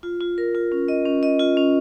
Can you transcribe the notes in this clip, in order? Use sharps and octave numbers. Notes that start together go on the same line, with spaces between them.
F4
F4
A#4
F4
C#4
D#5
C#4
D#5
F4
C#4